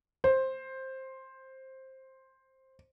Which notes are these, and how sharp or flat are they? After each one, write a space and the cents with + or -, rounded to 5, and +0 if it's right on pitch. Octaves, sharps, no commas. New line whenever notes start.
C5 +10